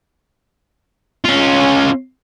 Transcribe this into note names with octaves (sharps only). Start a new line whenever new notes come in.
C#4 F4